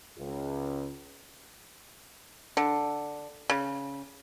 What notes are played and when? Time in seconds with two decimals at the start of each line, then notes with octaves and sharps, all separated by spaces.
0.17 C#2
2.57 D3
3.50 C#3